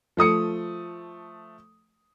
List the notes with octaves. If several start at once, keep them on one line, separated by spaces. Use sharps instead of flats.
F3 A3 D#6 C#7